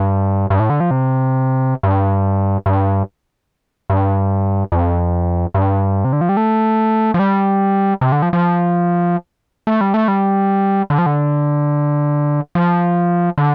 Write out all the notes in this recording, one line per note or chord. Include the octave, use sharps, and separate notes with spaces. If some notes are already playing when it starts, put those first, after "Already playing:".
Already playing: G2
G2
A2
D3
F3
C3
G2
G2
G2
F2
G2
C3
D3
F3
G3
A3
F3
G3
C3
D3
F3
F3
A3
G3
A3
G3
D3
F3
D3
F3
D3